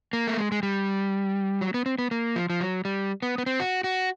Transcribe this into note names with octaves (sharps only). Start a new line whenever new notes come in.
A#3
A3
G#3
G#3
G3
F#3
B3
C4
B3
A#3
F3
F3
F#3
G3
B3
B3
C4
F#4
F#4